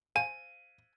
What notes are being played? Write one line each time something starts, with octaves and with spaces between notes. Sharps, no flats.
C5 F5 G#5 D#7